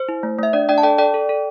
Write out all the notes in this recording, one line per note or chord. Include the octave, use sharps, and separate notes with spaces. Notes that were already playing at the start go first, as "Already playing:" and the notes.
Already playing: C5
E4
A3
A3 E5
D4 D5
D4 D5 G5
A5
A4 D5 G5
A4 D5 G5
A4
A4